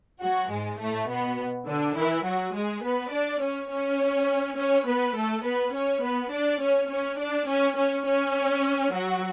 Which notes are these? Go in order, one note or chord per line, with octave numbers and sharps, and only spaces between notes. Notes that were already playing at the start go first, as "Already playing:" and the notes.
F#3 F#4
G#2 G#3
A2 A3
B2 B3
D3 D4
E3 E4
F#3 F#4
G#3 G#4
B3 B4
D4 D5
C#4 C#5
C#4 C#5
C#4 C#5
B3 B4
A3 A4
B3 B4
C#4 C#5
B3 B4
D4 D5
C#4 C#5
C#4 C#5
D4 D5
C#4 C#5
C#4 C#5
C#4 C#5
F#3 F#4